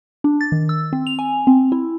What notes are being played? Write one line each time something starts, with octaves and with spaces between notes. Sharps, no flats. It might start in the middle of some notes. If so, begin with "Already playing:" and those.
D4
A6
D#3
E6
C4
F7
G#5
C4
E4